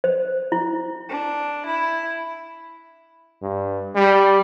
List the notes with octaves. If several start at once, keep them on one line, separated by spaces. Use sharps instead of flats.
C5
E4
D4
E4
G2
G3